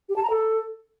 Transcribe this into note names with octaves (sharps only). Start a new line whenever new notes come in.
G4
A5
A#5
A4